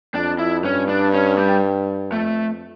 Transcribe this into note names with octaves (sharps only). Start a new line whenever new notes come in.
F2 D4
E4
G2 C#4
D4
C#4
G3
F2 A3